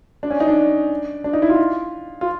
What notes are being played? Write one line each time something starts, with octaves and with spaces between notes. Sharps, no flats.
D4
C#4
D#4
D4
D4
D#4
E4
F4
F4